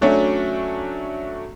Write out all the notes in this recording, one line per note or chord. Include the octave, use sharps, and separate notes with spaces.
F#3 A3 C#4 D4 F#4